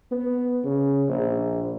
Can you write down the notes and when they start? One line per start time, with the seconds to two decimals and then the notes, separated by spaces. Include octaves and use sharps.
0.11 B3
0.64 C#3
1.08 A#1